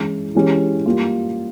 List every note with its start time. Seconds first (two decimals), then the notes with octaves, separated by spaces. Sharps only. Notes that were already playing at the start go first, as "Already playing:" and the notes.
Already playing: E3 G#3 C#4 E4
0.35 E3 G#3 C#4 G4
0.86 G3 A#3 F4